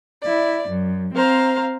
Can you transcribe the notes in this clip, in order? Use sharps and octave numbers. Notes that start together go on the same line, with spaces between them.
E4 D5
F#2
C4 C5 F5 A#5